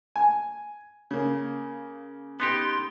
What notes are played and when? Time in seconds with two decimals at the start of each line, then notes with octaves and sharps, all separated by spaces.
0.16 G#5
1.11 C#3 A#3
2.40 B3 D#4 G4 C6